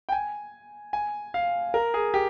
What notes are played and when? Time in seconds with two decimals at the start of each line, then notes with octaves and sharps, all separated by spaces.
0.09 G5
0.12 G#5
0.93 G#5
1.34 F5
1.74 A#4
1.94 G#4
2.14 G4